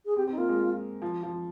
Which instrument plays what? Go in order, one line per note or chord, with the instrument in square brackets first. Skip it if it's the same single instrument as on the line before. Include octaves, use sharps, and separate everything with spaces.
[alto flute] G#4
[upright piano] C4 [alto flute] G4
[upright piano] C4 [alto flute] D#4
[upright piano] A#3 [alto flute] F4
[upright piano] G#3
F3
F3